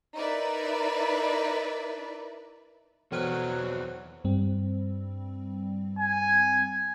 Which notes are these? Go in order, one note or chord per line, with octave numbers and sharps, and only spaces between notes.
D#4 E4 A#4 B4 D5 E5
E2 B2 E3 F#3 B4 C5 D5 F#6
G2 G3 C4
G#5